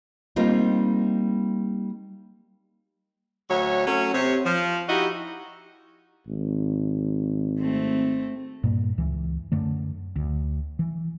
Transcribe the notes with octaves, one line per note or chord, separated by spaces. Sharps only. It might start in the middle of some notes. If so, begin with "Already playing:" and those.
G3 A#3 C4 D#4 F4
D2 F#3 C#5
F#3 A3 C#4
C3 C#5
F3
D#4 E4 F#4 G4 D#5
G#1
A3 C4
G2 A#2 A#3
C#2 E3
F#2 D3 A3
D2
E3